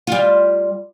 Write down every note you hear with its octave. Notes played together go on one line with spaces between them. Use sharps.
G3 F4